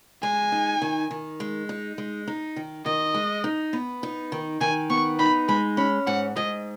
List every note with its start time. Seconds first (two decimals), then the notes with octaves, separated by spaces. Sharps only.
0.23 G#3 G#5
0.52 D#4
0.82 D#3
1.11 D#3
1.40 G#3
1.69 D#4
1.98 G#3
2.27 D#4
2.56 D#3
2.86 D#3 D#5
3.14 G#3
3.44 D#4
3.73 B3
4.03 D#4
4.32 D#3
4.61 D#3 G#5
4.90 B3 C#6
5.19 D#4 B5
5.48 G#3 B5
5.77 C#4 B5
6.07 G#2 F#5
6.36 G#2 D#5